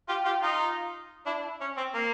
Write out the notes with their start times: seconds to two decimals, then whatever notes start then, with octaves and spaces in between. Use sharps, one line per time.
0.08 F4 G4
0.25 F4 G4
0.43 D#4 F4
1.26 D4 E4
1.61 C#4
1.77 C4
1.94 A#3